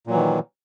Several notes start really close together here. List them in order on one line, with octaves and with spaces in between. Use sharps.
A#2 F#3 E3 D#3